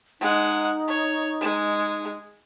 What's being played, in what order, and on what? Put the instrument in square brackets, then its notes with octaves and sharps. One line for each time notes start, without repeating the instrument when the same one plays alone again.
[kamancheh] G#3 F#5 [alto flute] D#4
[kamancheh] C#5
G#3